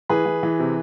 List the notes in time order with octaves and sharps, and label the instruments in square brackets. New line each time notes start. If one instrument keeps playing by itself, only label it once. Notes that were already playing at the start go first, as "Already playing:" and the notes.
[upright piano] E3 G#4 B4
E3
E3
C3